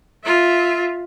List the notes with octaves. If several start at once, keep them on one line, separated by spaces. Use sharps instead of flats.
F4 E5